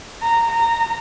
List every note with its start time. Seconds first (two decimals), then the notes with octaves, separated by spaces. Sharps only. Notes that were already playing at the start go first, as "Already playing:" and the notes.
0.22 A#5
0.51 A#5